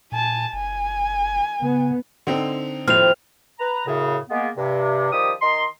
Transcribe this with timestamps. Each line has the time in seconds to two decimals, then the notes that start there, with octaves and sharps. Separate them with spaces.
0.12 A#2 G#5 A5
0.53 F#1 G#5
1.62 C#3 B3
2.27 D3 C4 D#4
2.88 D#2 A2 F3 C4 F6 F7
3.60 B4 A#5
3.86 F#2 A2 C#3
4.30 G#3 A#3 B3
4.57 G2 C3
5.12 D#3 F3 G3 G4 D#6
5.42 D#3 D#5 A#5 C6